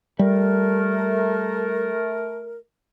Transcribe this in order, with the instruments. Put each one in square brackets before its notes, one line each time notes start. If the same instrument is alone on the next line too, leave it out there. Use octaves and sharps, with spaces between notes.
[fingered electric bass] G3 [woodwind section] A3 A#4